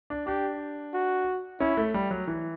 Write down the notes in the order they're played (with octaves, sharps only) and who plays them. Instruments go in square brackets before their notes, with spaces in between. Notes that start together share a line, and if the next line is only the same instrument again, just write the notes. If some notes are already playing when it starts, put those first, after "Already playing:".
[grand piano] D4
[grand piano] D4 [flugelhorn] G4
[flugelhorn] F#4
[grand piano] C#4 [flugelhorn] E4
[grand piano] A3
G3
F#3
E3